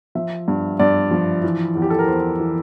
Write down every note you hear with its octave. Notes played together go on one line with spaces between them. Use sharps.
F3 E5
G2
G2 D5
F3
E3
E2
G4
A4
A#4
E2 C5
E3